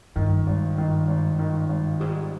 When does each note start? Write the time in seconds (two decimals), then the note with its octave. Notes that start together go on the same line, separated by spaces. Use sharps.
0.16 G2 D#3
0.47 G#1
0.78 D#3
1.08 G#1
1.39 D#3
1.69 G#1
2.00 G#2 G3